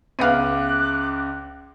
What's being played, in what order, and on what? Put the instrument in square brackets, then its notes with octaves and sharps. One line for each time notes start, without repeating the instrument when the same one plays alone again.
[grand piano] C#2 E5 D#7 [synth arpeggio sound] B3 F5 [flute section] D6 F#6